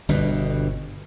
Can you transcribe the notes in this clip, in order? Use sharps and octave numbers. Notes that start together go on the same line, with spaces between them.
G1 G2 B2